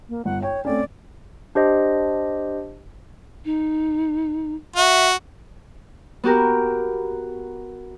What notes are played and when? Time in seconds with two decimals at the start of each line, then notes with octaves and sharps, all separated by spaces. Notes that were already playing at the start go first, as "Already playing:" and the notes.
0.09 A#3
0.25 G1 F#5
0.42 C#5 G5
0.65 A3 C4 C#4 D5
1.55 D4 G4 C5 D#5
3.45 D#4
4.76 F#4 E5
6.24 B3 F#4 G4 A#4